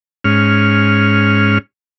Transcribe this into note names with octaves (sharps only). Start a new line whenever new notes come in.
G#2 C#4 F6